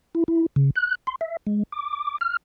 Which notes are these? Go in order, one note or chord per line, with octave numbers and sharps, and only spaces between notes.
E4
E4
C#3
F#6
C6
E5
G#3
D6
F6